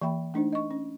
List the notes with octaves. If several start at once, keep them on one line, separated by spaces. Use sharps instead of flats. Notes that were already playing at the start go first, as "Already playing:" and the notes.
E3 A#3 E5 G5 B5
A3 D4 D#4 C5
D#5 C#6
C#4